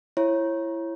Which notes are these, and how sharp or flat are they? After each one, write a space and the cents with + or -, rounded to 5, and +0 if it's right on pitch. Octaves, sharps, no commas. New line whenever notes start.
E4 +20 C#5 -25